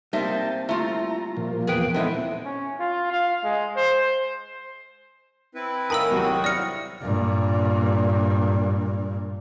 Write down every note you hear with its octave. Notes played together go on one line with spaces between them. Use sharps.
G3 A#3 C4 D#4 C5 E5 A5
A3 E4 F4 A#5
A#2 F3
E2 G#4 B4 G5
G3 G#3 B3 C4 D#4 E4 A4
C#4
F4
F5
G#3
C5
C4 E4 B4
A2 D#3 A#4 F5 G#5 B5 D#6 E6
C2 F#3 C4 F#4 F#5
E4 D5 F6 A#6 C#7
G2 A#2